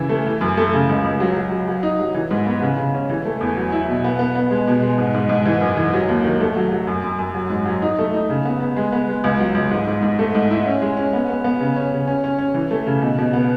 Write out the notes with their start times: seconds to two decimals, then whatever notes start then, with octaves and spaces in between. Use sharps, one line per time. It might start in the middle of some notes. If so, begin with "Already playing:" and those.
Already playing: C#3 E3 E4
0.09 A3
0.26 E3
0.41 F#2
0.57 A3
0.73 C#3
0.89 C#2
1.05 C#2
1.20 F#3
1.37 F#3
1.51 F#3
1.67 F#3
1.83 D#4
2.00 F#3
2.14 E3
2.31 G#2
2.46 B3
2.62 C#3
2.77 C#3
2.94 C#4
3.09 E3
3.25 A3
3.41 E2
3.57 F#3
3.72 E4
3.89 B2
4.04 B3
4.19 B3
4.35 B3
4.51 G#3
4.67 B2
4.82 G#3
4.98 G#2
5.14 G#2
5.29 G#2
5.45 E3
5.61 F#2
5.77 E3
5.94 F#3
6.09 D#2
6.24 D#3
6.40 A3
6.56 F#3
6.72 F#3
6.87 F#2
7.04 F#2
7.19 F#2
7.34 F#3
7.50 G#2
7.66 F#3
7.82 D#4
7.98 A3
8.14 D#4
8.30 C#3
8.45 B3
8.60 B3
8.77 G#3
8.92 B3
9.09 G#3
9.24 C#2
9.39 F#3
9.55 C#2
9.71 G#2
9.88 G#2
10.03 G#2
10.19 A3
10.35 G#2
10.51 E4
10.66 C#4
10.82 G#3
10.97 C#4
11.13 B3
11.29 B3
11.44 B3
11.60 C#3
11.76 C#4
11.92 C#3
12.07 C#4
12.24 C#4
12.39 C#4
12.54 E3
12.71 A3
12.87 C#3
13.02 B2
13.18 B2
13.33 B3